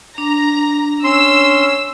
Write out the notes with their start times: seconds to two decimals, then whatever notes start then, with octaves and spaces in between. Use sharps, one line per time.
0.18 D4 A#5
1.04 C#4 C6 E6